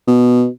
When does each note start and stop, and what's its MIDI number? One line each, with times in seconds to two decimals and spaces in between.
0.08 0.47 47